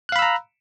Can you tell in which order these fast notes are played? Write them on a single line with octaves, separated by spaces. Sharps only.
F#6 F5 B5 E6 A#5